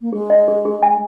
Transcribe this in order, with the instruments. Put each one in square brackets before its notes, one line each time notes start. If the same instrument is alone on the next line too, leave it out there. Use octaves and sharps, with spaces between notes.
[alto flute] A#3
[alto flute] G#3 [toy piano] G#4
[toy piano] D#5
G#4
G#4
G#5